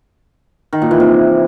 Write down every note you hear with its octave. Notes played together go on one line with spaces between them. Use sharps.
D#3
A#2
E3
C3